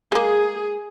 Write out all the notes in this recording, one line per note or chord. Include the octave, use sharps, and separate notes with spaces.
G#3 A#3 G#4